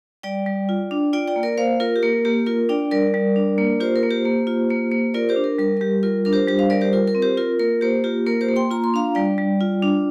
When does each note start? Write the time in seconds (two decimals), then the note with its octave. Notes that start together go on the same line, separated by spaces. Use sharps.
0.23 G3 D5 G5
0.46 G3
0.69 F4
0.91 D4
1.13 F4 D5 G5
1.28 D5 G5
1.36 A#3
1.43 A#4 D5
1.57 A#3 C5 F5
1.80 F4 A#4
1.96 G4
2.03 A#3 A#4
2.25 A#3 G4
2.46 F4 A#4
2.69 D4 D5 G5
2.91 G3 A#4 D5
3.14 G3
3.36 D4
3.58 A#3
3.80 F4 G4 C5
3.96 A#4
4.03 A#3
4.11 G4 C5
4.25 A#3
4.47 F4
4.70 A#3
4.92 A#3
5.14 F4 A#4 D5
5.29 G4 C5
5.36 D4
5.44 A#4
5.59 G3 A#4
5.77 A#4
5.81 G3 G4
6.03 F4 A#4
6.25 D4 A#4
6.33 G4 C5
6.47 G3 G4 C5
6.59 C5 F5
6.70 G3 A#4 D5
6.81 G4 C5
6.93 F4 A#4
7.07 A#4
7.15 C4
7.22 G4 C5
7.37 F4 A#4
7.59 A#3 A#4
7.81 A#3 G4 C5
8.04 F4 G4
8.26 A#3 A#4
8.41 G4 C5
8.49 A#3
8.56 G5 C6
8.71 F4 A#5
8.84 C6
8.94 D4 F5 A#5
9.15 G3 D5 G5
9.38 G3
9.61 F4
9.82 D4